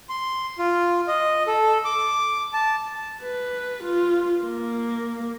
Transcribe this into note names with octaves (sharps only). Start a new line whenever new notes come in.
C6
F4
D#5
A4
D6
A5
B4
F4
A#3